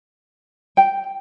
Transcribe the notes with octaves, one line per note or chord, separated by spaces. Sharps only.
G5